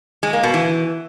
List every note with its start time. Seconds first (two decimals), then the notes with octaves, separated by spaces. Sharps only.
0.23 G#3
0.33 A#3
0.43 B2
0.54 E3